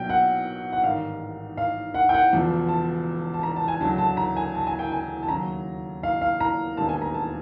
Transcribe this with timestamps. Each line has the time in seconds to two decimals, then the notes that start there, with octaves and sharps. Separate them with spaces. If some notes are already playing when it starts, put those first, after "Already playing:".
Already playing: B1 B2 F#3 G5
0.09 F#5
0.72 F#5
0.84 A1 G#2 D#3 G3 F5
1.57 F5
1.94 F#5
2.09 G5
2.14 F#5
2.33 E1 E2 C#3 F3
2.69 A5
3.34 A5
3.43 A#5
3.56 A5
3.68 G#5
3.81 D2 C#3 F#3 A5
3.98 A5
4.17 A#5
4.37 G#5
4.55 A5
4.67 G#5
4.79 G5
4.92 G#5
5.23 A5
5.28 D#2 C#3 F#3 A#5
6.03 F5
6.21 F5
6.40 A#5
6.77 E1 D#2 D3 G3 A5
6.89 G#5
7.02 A#5
7.14 A5